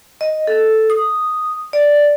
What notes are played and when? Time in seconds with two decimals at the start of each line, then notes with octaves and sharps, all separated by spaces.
0.21 D#5
0.47 A4
0.90 D#6
1.73 D5